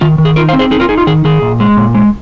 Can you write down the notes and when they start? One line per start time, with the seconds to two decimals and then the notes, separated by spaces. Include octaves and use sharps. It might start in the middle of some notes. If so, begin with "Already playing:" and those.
0.01 D#3 F4
0.18 D#3
0.25 G#4
0.36 D#4 F4 A#4
0.49 C5 F5
0.53 C4
0.59 G#4 C5
0.71 D#4 G#4
0.80 F4 A#4
0.89 D#4 G#4
0.98 F4
1.07 D#3 G#4
1.25 D#3 G#4
1.42 A#2
1.60 G#3
1.77 A#2
1.95 G#3